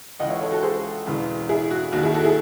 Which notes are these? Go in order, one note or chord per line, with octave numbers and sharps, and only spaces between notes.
C#2 C#3 E3 D#5 F#5
C#5 E5
A4 C#5
F#4 A4
G#4 C5
E1 E2 C#3 E3
E4 G#4
F#4
D#2 D#3 F#4
E4 G#4
F#4 A4
E4 G#4